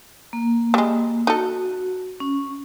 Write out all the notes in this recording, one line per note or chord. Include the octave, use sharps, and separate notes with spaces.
A#3
G3 G#3
D#4 F#4 A4
C#4